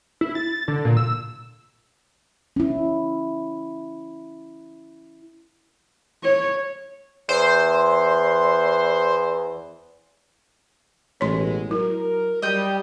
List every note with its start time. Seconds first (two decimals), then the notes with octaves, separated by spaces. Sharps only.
0.21 E4
0.35 A6
0.68 D3
0.85 A#2
0.97 E6
2.56 C#4 E4
6.23 C#5
7.29 E2 C5
11.21 A1 B2 F#3 G#3 C#5 C6
11.71 F#3 E4 A#4
12.42 G3 D#5 G5